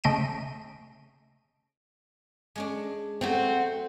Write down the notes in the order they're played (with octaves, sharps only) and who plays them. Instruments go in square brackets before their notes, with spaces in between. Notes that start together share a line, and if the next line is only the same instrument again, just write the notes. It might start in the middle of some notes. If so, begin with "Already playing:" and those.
[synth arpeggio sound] C#3 A3 D#5 G6 D7 D#7
[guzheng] G#3 C#4 D4
[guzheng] F#3 A3 [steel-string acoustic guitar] C4 F#4